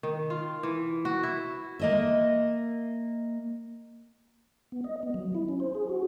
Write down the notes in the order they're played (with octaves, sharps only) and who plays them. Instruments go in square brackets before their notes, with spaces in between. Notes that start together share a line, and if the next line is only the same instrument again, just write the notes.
[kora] D#3
F4
E3
F#4
E4
[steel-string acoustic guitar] A#3 D#5 E5
[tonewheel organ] B3
D#5
B3
F#3
E4
C#4
C5
G#4
F#4